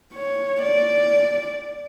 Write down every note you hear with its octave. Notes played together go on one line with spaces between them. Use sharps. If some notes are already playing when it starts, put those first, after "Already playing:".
C#5
D5